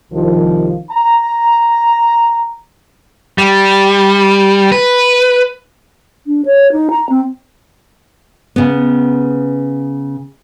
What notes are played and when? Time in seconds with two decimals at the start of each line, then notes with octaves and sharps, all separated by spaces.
0.13 C2 D#3 F3
0.92 A#5
3.38 G3
4.72 B4
6.27 D4
6.46 C#5
6.72 D#4
6.91 A#5
7.10 C4
8.56 C#3 B3